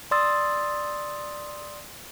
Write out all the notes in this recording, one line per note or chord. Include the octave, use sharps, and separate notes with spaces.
D5 C6 D#6 E6 A6